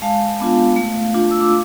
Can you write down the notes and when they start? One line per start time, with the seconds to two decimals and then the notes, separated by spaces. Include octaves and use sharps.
0.02 G#3 F5 A5
0.40 B3 D4 F4
0.76 A3
1.14 D4 F4
1.31 E6
1.41 D6